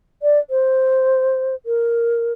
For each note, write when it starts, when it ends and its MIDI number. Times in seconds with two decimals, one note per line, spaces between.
0.22 0.39 74
0.50 1.55 72
1.66 2.33 70